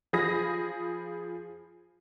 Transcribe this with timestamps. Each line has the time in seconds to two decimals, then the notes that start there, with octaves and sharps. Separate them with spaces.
0.13 F3 G#4 B5 D#6 A#6